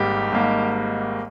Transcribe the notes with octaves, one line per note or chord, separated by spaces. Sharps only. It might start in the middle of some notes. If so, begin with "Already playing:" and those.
Already playing: G#1 G#2 G3 A#3 G4
G#1 G#2 G3 A#3